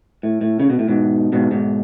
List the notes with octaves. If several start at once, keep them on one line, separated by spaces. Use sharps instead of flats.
A2
A2
C#3
B2
A2
G#2 B2
G#2 B2
G#2 B2